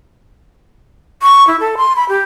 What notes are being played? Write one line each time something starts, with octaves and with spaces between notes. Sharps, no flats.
C#6
E4
A4
C6
B5
G4